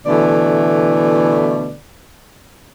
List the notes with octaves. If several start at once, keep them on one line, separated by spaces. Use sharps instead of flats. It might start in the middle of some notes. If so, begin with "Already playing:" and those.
B2 D3 E3 A3 D5